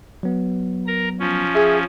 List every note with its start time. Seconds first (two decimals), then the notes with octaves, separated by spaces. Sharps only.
0.23 F#3 B3
0.87 A#4 A#5
1.20 F3 C#4
1.55 G#4 E5